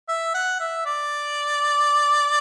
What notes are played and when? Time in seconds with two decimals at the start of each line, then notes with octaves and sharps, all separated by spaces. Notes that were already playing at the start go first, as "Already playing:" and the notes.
0.08 E5
0.34 F#5
0.60 E5
0.86 D5